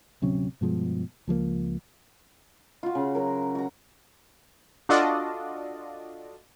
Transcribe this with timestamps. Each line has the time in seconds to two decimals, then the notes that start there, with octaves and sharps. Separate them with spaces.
0.22 D1 C3 F#3 C#4
0.61 G2 B2 F3 G#3
1.28 C#2 F3 F#3 A#3
2.83 F4 F#4
2.95 C#3
3.15 F#3 A#4
3.55 F#4 A#5
4.89 D4 F4 F#4 A4 D5 D#5